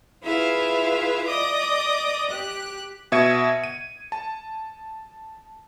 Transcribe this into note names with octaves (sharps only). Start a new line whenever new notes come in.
E4 F4 G#4 B4 E5 F5
D5 D#5 D6 D#6
G4 F#6
B2 E5 G#6 C#7 D#7
D#7
A5